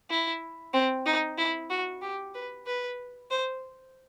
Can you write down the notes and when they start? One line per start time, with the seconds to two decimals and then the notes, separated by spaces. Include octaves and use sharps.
0.10 E4
0.74 C4
1.06 D#4
1.38 E4
1.70 F#4
2.02 G4
2.34 B4
2.67 B4
3.31 C5